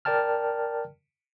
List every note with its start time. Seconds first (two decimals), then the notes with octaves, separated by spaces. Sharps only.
0.05 A#4 D5 G5 A5 F6